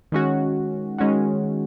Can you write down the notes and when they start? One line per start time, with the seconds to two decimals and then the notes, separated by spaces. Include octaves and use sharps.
0.12 D#3 G#3 C#4 F#4
0.98 D#3 G#3 C#4 F#4